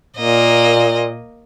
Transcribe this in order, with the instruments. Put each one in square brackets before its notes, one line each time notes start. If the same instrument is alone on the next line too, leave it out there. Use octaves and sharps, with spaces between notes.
[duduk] A#2 [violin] A#3 D#5